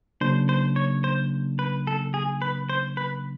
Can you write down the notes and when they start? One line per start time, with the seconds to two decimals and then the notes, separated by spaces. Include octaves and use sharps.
0.21 C#3 F#3 A#3 D4 C5
0.49 C5
0.76 C#5
1.04 C5
1.59 B4
1.87 A4
2.14 G#4
2.42 B4
2.69 C5
2.97 B4